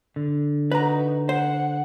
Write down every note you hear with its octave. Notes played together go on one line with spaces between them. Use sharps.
D3
D#4 F#4 B4 A#5
C5 F#5